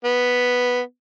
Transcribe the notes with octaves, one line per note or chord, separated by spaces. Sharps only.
B3